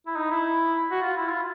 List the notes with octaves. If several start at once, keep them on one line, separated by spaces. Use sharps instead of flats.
E4
D#4
E4
F#4
F4
E4
F4